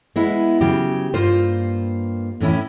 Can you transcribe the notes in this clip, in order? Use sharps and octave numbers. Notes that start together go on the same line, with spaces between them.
G#3 B3 E4
C#3 F#3 G4
G2 A#3 F4 C5
A2 E3 C#4 E4